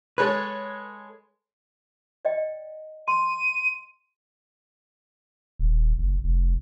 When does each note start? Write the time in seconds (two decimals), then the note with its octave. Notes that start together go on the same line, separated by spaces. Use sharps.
0.18 G#3 A4 B4 C#5 F#6
2.25 D5 D#5 G5
3.08 C6 D#7
5.59 D#1
5.98 F#1
6.24 F1